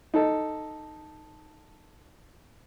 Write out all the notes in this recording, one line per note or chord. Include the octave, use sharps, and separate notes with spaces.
D#4 A4